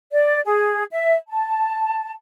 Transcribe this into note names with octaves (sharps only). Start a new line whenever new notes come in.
D5
G#4
E5
A5